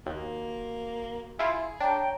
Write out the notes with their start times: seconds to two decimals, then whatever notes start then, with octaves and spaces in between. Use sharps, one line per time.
0.06 D#2 A#3 F#4
1.39 E4 F4 G#4
1.80 D4 C#5 G5 A#5